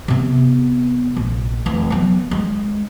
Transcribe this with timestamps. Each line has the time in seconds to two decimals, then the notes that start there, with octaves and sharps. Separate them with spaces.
0.08 C3 B3
1.17 A#1
1.66 F1 E3
1.90 F#3 B3
2.31 G#3